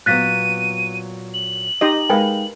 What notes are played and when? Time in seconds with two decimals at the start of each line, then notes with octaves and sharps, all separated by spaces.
0.06 A#2 F#3 B3 F#6 A6 B6 D#7
1.33 F#7
1.81 D#4 G4 D#5
2.10 G#3 D#4 A#4 B4 F5 G5 G#5